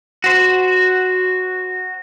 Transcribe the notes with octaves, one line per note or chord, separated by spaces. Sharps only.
F#4 C5